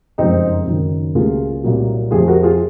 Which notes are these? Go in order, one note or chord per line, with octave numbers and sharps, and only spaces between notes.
F#1 F2 C3 F3 G#3 C4 D#4
F#1 F#2 D#3
C#2 C3 F#3 A#3 F4 G#4
C2 A#2 F#3
F2 C3 F3 F4 G#4
F#4 A#4
F4 G#4